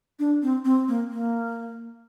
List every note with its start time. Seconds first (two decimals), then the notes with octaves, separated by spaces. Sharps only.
0.19 D4
0.43 C4
0.65 C4
0.88 A#3
1.11 A#3